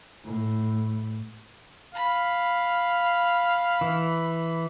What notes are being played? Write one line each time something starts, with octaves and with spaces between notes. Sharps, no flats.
A2
F5 B5
E3